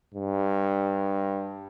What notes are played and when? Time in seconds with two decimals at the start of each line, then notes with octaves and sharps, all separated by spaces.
0.15 G2